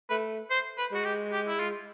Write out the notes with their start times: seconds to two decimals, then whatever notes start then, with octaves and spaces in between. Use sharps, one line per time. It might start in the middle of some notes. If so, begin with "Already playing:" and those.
0.10 A3 B4
0.51 C5
0.78 B4
0.92 G#3 F#4
1.05 G4
1.32 G4
1.48 E4
1.60 F4